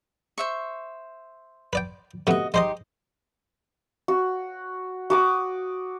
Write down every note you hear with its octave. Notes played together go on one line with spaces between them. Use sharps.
C5 E5 C#6
B4 D5 G5
C3 A3 B3 F#4 D#5
G#3 D#4 G4 C5 D#5 C6
F#4
F#4 D6 D#6